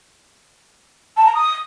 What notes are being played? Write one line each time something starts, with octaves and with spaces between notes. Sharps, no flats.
A5
A#5
D#6